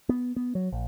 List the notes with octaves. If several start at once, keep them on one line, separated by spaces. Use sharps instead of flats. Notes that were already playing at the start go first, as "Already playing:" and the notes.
B3
B3
F#3
A#1